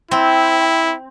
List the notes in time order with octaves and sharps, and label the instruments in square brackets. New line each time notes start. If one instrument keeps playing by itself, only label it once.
[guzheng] C4 [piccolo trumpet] E4